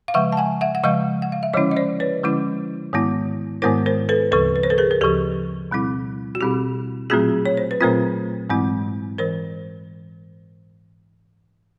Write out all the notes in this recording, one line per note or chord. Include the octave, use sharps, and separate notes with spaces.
F5
C#3 F3 G#3 E5 F#5
A5
F#5 G#5
E5 F#5
F#5
C#3 F3 G#3 D#5 F5
F#5
F5
E5
D3 F3 G#3 C#4 E4 C#5 D#5
D#5
C5 D5
B4 C#5
D3 F3 G#3 C#4 E4
G#2 D#3 G#3 B3 E4
G#2 D#3 G#3 B3 E4 A#4 C5
A#4 C5
A4 B4
D2 C#3 F3 A4 B4
B4
C5
A4 B4
G#4 A#4
A#4
D2 C#3 F3 G4 A4
B2 G3 C4 E4
F#4
B2 G3 C4 E4 G4
A#2 F#3 A3 C4 F4 F#4 G#4
C#5
C5
B4
A#2 F#3 A3 C4 F4 A#4 C5
G#2 E3 G#3 C4 E4
E3 A#4 C5